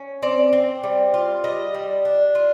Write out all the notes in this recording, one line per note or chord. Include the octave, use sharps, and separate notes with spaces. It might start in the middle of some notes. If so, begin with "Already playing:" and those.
Already playing: C#4
C4 D5
C4
G3
F4
G3 D#5
G3
D4
F4